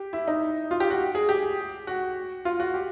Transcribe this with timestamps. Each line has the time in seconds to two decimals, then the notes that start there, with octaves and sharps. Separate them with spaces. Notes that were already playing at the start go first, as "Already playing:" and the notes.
Already playing: G4
0.13 E4
0.27 D#4
0.71 F4
0.80 G4
0.90 F#4
1.15 G#4
1.29 G4
1.87 F#4
2.45 F4
2.60 F#4
2.74 G4